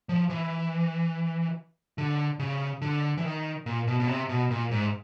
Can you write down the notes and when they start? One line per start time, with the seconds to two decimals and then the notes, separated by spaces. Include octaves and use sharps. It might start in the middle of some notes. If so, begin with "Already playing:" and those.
0.09 F3
0.29 E3
1.98 D3
2.39 C#3
2.82 D3
3.18 E3
3.24 D#3
3.66 A#2
3.87 B2
4.00 B2
4.08 C3
4.29 B2
4.50 A#2
4.71 G#2